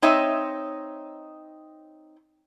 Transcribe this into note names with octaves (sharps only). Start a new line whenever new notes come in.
C4 D#4 C#5 D#5 E5